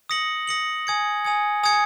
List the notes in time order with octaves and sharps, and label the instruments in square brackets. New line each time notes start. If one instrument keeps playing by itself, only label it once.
[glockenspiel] D#6 A#6 C#7 F#7
D#6 A#6 C#7 F#7
G#5 D#6 G#6 C#7
G#5 D#6 G#6 C#7
G#5 D#6 G#6 C#7